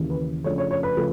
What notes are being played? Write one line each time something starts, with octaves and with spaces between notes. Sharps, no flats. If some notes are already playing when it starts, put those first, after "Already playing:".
Already playing: D#2 C#3 E3
B4
C#3 F3 A3 D4 C#5
C#5
C#5
B4
C#3 F3 A3